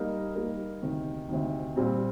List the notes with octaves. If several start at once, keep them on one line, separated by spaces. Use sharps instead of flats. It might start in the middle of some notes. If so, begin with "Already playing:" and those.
Already playing: G3 A#3 D#4 A#4
G3 A#3 D#4 A#4
D2 C3 D#3
D2 C3 D#3
A#2 G3 C4